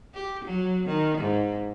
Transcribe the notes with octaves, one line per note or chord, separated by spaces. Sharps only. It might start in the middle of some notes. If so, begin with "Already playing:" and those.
G4
F#3
D#3
G#2